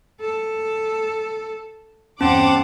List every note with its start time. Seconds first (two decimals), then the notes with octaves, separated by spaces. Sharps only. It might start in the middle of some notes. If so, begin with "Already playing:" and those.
0.21 A4
2.21 E2 G2 C4 C#4 C5 F#5 A5 D6